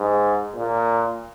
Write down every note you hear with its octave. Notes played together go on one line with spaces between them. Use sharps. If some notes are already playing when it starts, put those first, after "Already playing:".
Already playing: G#2
A#2